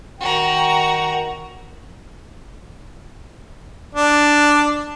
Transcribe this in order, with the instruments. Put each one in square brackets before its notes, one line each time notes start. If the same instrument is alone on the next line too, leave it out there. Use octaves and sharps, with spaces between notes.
[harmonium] D#3 G5 [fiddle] F#4 A#5
[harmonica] D4